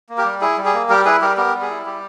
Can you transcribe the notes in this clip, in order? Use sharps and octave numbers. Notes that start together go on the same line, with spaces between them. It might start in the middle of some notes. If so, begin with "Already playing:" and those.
A#3
G4 A#4
G3
E4 G#4
G3
G#4
A#3
G3 G4 A#4
E4 G#4 B4
G3 G4 A#4
B3 G4 A#4
G3
G#4
E4
G3 G4